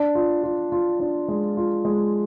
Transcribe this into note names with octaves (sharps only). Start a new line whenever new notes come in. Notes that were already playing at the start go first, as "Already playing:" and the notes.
Already playing: D4
F4
F4
F4
D4
G#3
F4
G#3